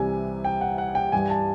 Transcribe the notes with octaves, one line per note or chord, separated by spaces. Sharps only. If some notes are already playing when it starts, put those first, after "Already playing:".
Already playing: C2 C3 E3 G3 G#5
G5
F#5
F#5
G5
G2 E3 G3 G#5
A5